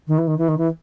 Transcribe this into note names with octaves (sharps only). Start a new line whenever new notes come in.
D#3
E3
D#3
E3
D#3
E3